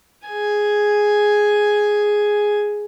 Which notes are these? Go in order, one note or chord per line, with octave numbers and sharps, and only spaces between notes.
G#4 G#5